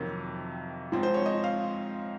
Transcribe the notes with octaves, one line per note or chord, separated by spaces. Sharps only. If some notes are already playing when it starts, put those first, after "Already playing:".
Already playing: F2 C3 D#3 F#3 A#3
G#2 F3 C4
C5
C#5
D#5
F5